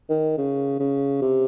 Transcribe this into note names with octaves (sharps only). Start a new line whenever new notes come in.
D#3
C#3
C#3
C3